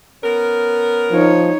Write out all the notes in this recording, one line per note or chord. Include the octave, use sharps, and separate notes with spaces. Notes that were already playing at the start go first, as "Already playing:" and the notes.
B3 C#4 A#4
F3 D#4 C#5